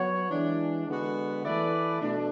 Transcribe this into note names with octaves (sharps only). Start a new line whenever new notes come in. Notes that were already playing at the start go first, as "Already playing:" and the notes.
Already playing: F#3 B3 F#4 C#5
E3 G#3 D4
D3 G#3 B3 F#4
E3 A3 E4 B4 D5
B2 A3 D4